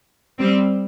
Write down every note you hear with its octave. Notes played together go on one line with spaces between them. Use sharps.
G3 C4